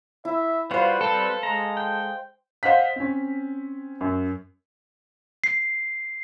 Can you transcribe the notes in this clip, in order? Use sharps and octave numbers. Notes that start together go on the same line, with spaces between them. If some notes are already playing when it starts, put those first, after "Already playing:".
E4 E5
G3 F4 F#4 B4 C5 F5
G3 C4 A4
G#3 A#5
G5
C5 D#5 F5 F#5 B6
C4 C#4
F#2
C7